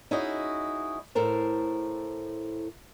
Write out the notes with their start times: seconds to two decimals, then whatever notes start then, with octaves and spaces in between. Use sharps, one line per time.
0.11 C#4 D#4 E4 F#4 G#4 D#5
1.15 A2 A4 A#4 C5